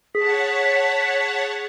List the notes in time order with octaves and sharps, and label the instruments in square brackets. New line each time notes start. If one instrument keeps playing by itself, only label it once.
[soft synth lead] G#4 [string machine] C#5 F#5 A5 [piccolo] B6